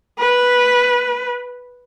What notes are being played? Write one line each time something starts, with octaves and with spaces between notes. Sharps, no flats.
B4